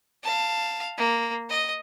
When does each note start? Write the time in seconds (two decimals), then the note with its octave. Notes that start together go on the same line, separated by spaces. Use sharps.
0.24 F5 A5
0.98 A#3
1.50 D#5